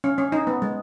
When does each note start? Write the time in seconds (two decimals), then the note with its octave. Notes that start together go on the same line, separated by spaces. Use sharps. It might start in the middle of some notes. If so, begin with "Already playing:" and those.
0.04 C#4
0.18 C#4
0.32 D#4
0.47 B3
0.62 G#3